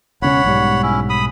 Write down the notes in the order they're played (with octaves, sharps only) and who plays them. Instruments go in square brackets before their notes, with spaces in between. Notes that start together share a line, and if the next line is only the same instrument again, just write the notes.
[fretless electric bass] E1 C#3 C#4 [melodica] C#5 F#5 B5
[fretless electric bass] B1 G#2 G3
[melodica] C#4 E4
B5 D#6